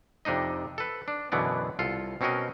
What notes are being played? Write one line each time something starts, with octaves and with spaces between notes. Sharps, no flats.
F2 C3 D4 D#4 D#5
A4 B4
D4
F#2 B2 D3 E3 B3 D5
C2 F4 A4
B2 C4 C#4 F#4 A#4 D#5